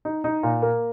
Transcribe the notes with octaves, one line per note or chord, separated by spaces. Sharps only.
D#4
D#4
A#2
A#3